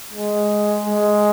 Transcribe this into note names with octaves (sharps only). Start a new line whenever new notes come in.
G#3
G#3